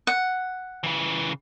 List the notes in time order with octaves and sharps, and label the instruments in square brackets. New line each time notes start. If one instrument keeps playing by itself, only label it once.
[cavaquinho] F#5
[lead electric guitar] C#3 E3